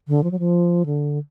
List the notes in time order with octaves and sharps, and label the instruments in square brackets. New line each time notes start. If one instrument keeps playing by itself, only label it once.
[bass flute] D3
F3
F#3
F3
D3